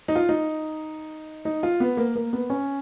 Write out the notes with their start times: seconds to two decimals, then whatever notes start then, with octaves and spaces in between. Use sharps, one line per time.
0.08 D#4
0.15 F4
0.29 D#4
1.45 D#4
1.63 F4
1.80 B3
1.97 A#3
2.16 A#3
2.33 B3
2.50 C#4